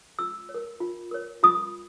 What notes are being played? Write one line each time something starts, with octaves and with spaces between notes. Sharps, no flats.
F4 E6
C#5
A#4
F4
A#4 C#5
F4 D#6